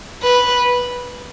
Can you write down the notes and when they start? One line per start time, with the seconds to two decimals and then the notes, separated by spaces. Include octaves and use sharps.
0.23 B4